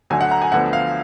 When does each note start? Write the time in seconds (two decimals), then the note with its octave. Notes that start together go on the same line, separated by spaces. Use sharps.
0.10 D2 D3 F#3 G#5
0.21 F#5
0.31 A#5
0.42 G#5
0.52 D2 D3 F3 B3 F#5
0.73 F5